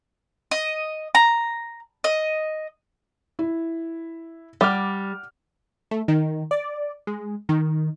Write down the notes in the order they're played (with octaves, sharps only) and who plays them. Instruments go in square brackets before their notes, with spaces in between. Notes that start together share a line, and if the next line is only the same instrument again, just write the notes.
[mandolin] D#5
A#5
D#5
[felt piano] E4
[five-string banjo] G3 [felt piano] F#5 D6 F6
[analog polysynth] A3
D#3
D5
G#3
D#3